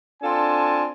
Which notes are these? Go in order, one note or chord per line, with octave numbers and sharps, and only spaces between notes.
C4 D4 F4 A4 G#5 A5